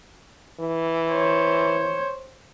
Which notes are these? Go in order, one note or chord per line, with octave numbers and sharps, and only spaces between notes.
E3
C5 C#5